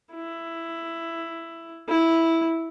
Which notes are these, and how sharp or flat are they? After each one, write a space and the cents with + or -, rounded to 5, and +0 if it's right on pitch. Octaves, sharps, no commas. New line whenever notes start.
E4 +10
E4 -5